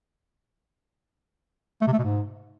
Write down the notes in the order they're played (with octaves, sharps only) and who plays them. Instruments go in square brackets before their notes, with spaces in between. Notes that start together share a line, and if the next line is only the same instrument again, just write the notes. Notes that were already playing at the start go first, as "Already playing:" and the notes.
[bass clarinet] A3
C3
A3
B2
G#2